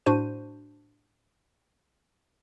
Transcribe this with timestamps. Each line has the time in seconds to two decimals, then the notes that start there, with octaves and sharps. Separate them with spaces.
0.06 A2 D4 F#4 C5 D#7